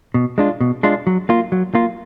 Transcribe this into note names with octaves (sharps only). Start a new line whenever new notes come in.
B2
G#3 D4 F4
B2
G#3 D4 F4
F#3
A#3 F4
F#3
A#3 F4